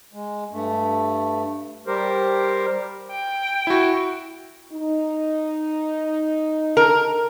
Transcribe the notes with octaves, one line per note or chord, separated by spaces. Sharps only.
G#3
G2 A3
G3 G4 A#4 C5
G5
E4 F#4
D#4
A#4